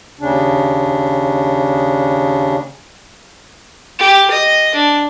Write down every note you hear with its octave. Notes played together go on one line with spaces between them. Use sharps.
D#2 C#3 D4
G4
D#5
D4